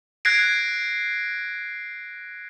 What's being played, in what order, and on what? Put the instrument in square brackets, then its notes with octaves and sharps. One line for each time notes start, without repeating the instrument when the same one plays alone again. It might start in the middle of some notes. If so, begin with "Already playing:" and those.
[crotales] F#6 G#6 A#6 C7 D7